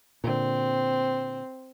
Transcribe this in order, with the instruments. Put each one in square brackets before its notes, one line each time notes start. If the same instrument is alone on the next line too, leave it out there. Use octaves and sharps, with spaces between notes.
[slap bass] A#2 D3 [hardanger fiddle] C4